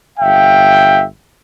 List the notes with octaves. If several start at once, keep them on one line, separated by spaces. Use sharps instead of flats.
G1 E5 F5 G5